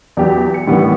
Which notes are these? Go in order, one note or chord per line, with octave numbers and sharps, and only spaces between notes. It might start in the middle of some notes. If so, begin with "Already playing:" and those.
E2 F#3 G4
C#7
A2 D#3 E3 G3 B3